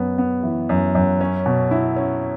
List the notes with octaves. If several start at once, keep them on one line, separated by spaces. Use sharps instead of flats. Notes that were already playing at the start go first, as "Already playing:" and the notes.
Already playing: F#2 B3
B3
E3
F#2
F#2
C#4
B2
E4
C#4